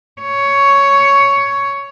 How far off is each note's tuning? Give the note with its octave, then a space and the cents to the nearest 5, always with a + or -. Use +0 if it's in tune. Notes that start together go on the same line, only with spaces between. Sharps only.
C#5 +10